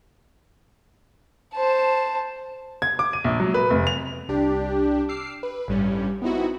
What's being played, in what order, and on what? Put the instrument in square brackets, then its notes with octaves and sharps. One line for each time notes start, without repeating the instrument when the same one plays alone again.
[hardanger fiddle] C5 A5
[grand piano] G#6
D6
D#7
A#1
F#3
B4
F1
F7
[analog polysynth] C2 D4 G4
D6 E6 F6 C7
B4
A1 G2 G3 C#4
B3 C4 D#4 E4 F#4